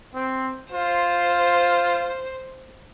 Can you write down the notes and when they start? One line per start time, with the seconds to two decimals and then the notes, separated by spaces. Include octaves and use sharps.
0.15 C4
0.72 F4 C5